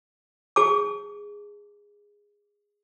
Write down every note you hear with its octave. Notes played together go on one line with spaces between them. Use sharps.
G#4 A5 D6